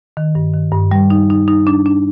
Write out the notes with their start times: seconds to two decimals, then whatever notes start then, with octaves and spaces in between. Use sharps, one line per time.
0.17 D#3
0.35 G2
0.54 D#3
0.72 G2
0.91 G3
1.10 D#4
1.30 D#4
1.48 D#4
1.67 D4
1.86 D4